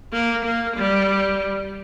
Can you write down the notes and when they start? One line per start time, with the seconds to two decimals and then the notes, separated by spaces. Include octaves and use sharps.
0.13 A#3
0.45 A#3
0.77 G3